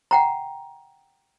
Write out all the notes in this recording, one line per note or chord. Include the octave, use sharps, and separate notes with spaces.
F#5 G5 A#5